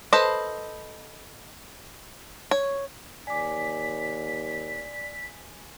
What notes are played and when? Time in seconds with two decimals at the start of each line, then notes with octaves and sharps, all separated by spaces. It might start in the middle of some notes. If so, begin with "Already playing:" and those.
0.13 A4 B4 C5 D#5
2.51 C#5
3.27 D#2 D5 G#5 D6 B6